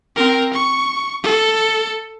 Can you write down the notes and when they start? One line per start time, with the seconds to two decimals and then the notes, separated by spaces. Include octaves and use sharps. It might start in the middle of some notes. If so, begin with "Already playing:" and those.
0.16 C4 A#4
0.54 C#6
1.23 A4